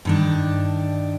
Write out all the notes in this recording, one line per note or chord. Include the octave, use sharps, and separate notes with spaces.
G2 D#3 D4